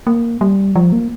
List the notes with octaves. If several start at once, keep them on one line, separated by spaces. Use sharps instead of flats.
A#3
G3
F3
A#3